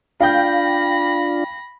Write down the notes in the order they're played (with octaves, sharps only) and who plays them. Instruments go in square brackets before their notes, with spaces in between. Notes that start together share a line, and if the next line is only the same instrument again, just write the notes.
[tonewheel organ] D4 F4 [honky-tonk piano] F5 G5 G6 [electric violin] B5 A#6